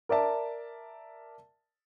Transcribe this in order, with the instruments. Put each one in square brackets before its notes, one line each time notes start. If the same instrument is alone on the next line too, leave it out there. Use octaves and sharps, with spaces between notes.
[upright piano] A#4 D5 E5 A5